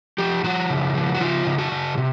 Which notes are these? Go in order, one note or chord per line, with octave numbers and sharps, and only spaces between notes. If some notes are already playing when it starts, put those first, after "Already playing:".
F3 G4
F3 F#4
C#3
F3
F#4
C#3 F4
C#3
F#4
C#3
C3